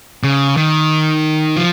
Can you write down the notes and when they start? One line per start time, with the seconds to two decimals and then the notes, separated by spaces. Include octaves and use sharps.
0.23 C#3
0.57 D#3
1.57 F3